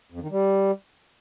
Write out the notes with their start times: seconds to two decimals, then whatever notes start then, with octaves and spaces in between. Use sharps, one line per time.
0.12 F2
0.21 D#3
0.31 G3